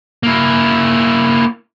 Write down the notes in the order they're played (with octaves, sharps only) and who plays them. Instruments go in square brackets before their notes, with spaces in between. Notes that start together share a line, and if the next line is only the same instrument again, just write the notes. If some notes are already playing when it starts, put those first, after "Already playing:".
[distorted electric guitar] A#3 E4